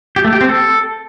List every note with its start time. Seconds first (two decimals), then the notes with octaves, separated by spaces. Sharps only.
0.16 G4
0.24 A3
0.33 G4
0.41 C4
0.49 A4